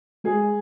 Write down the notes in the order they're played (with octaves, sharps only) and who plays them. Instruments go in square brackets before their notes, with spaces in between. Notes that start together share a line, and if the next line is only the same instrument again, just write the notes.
[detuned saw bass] G#3 [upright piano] G#4